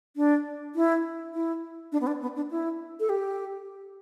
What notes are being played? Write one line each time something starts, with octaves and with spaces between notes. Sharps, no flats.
D4
E4
E4
D4
B3
D4
B3
D4
E4
A4
G4